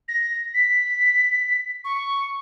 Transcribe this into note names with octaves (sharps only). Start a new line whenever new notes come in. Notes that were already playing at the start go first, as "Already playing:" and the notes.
A#6
B6
C#6